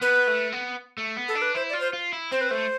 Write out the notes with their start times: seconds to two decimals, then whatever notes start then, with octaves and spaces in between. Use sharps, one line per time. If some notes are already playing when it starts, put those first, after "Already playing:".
0.01 B3 B4
0.27 A3
0.52 B3
0.98 A3
1.17 B3
1.28 A4
1.35 D4
1.42 B4
1.55 E4 C5
1.70 F4 D5
1.80 C5
1.93 F4
2.13 E4
2.32 C4 C5
2.41 B4
2.49 A3 C5